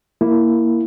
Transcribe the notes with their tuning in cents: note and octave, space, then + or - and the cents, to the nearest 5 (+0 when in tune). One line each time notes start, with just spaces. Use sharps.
A#3 +0 E4 +0